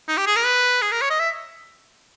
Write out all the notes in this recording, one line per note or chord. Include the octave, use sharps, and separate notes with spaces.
D#4
G4
G#4
A#4
B4
G#4
A#4
C#5
D#5
E5